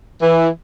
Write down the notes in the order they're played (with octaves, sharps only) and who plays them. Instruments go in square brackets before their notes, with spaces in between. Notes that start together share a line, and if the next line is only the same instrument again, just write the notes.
[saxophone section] E3